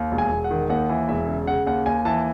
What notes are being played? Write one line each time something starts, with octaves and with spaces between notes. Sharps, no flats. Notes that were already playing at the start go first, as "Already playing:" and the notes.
Already playing: D#2
E1
G#5
E1
F#5
D#3
D#2 F#5
E3
E1 E5
C#3
C#3 F#5
D#2 F#5
D#2 G#5
E3 A5